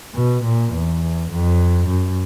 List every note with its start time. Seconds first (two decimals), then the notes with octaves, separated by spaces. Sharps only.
0.15 B2
0.44 A#2
0.73 E2
1.31 F2
1.89 F#2